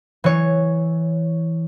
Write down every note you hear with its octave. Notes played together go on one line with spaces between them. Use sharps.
E3 C#5